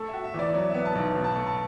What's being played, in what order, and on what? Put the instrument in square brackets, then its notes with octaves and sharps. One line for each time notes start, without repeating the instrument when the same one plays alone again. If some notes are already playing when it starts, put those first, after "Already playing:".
Already playing: [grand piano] A3 [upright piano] A4
[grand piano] F#4 [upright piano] E5
[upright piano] E5
[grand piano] E2
[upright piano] D5
[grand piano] F#3 [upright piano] D5
[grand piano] B3 [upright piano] E5
[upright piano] A5
[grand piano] B1
[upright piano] A5
[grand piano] B2
[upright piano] A5
[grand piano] A3
[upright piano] A5